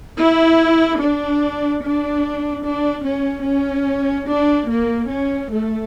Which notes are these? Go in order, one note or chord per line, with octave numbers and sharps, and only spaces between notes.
E4
D4
D4
D4
C#4
C#4
D4
A#3
C#4
A3